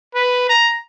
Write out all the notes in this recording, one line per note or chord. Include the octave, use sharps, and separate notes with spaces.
B4
A#5